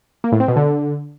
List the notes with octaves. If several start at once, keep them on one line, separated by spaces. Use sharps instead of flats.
A#3
A2
C4
B2
D3